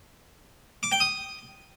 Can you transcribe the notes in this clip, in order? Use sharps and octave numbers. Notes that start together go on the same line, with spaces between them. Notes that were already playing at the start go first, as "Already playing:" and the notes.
D6
G5
D#6